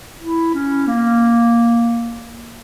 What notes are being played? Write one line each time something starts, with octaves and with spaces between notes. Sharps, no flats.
E4
C#4
A#3